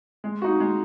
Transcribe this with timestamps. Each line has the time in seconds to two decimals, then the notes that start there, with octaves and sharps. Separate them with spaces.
0.24 G#3
0.42 D#4 F#4
0.60 G#3